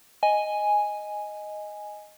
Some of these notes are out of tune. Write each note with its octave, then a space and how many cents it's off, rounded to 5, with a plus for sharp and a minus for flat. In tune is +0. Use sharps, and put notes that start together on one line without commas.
D#5 +0 G#5 +0